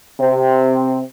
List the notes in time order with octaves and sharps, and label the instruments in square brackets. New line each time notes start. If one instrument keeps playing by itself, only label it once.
[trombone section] C3 C4